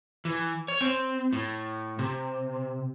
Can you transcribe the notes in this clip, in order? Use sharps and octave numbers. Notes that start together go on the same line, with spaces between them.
E3
C#5
C4
A2
C3